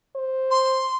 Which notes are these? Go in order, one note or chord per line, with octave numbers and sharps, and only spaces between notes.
C5
C6